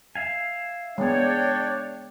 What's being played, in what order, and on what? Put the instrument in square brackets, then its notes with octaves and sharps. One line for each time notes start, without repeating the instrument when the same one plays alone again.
[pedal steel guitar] E5 F5 G#5
[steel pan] G#3 B3 [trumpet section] D4 G5 [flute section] C#5 D5